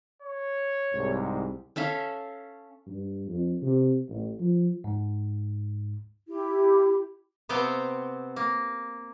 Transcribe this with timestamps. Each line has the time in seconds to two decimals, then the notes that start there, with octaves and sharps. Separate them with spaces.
0.22 C#5
0.93 C2 G#2
1.76 C#4 A4 E5 F5
2.87 G2
3.27 F2
3.62 C3
4.09 A1
4.40 F3
4.84 G#2
6.28 E4 G4
7.49 C3 B3 C4 F5 G5
8.36 A#3